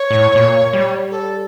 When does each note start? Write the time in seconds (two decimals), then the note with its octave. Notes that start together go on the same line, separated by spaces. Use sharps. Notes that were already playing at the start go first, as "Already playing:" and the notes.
Already playing: C#5
0.11 A2
0.35 A#2
0.73 G3
1.11 A4